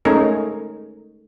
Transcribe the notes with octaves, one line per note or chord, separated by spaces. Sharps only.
G#3 A3 C#4 D#4 A#4